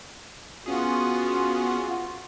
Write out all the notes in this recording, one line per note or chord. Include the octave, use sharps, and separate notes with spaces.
B3 C#4 F4 F#4 G#4